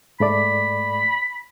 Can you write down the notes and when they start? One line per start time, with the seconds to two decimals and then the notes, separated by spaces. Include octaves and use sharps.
0.20 G#2 A3 D5 B5